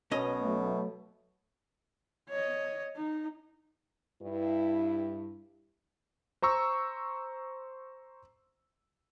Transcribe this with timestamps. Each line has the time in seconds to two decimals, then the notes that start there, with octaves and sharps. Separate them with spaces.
0.11 B1 B2 C#4 D#5
0.42 F#3 A3
2.29 C#5 D#5
2.96 D#4
4.22 G2 E4
6.42 C5 A#5 C#6 E6